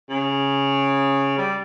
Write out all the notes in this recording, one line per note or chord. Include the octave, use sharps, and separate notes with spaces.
C#3
G3